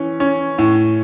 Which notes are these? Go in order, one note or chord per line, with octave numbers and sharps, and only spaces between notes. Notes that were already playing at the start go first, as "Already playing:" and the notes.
Already playing: E3 C#4
C#4
A2